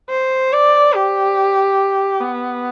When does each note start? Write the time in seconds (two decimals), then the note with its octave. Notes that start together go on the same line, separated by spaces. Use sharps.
0.10 C5
0.52 D5
0.94 G4
2.20 B3